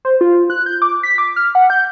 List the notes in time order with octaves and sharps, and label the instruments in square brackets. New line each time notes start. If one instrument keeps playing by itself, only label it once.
[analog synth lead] C5
F4
F#6
G6
D6
B6
D6
F6
F#5
G6